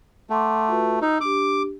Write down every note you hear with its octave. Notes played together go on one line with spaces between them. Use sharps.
A3 F#5 C6 D6
F4 F#4 B4
D#4 E6
D4 G4 D6